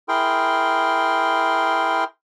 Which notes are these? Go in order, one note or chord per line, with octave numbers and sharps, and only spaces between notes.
E4 G#4 A#4 G5 C6